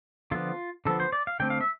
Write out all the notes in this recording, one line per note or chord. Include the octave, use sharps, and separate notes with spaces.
D3 F3 B3 F4
D3 F3 B3 A4
C5
D5
F5
D3 A3 C4 G5
F5
E5